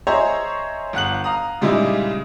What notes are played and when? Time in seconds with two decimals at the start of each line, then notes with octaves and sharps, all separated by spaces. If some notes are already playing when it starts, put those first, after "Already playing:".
0.07 G#4 C5 C#5 D#5 E5 A#5
0.93 G1 F#5 F#6 F#7
1.24 F5 A#5 D#6
1.61 A#2 C#3 G3 G#3 D#4 E4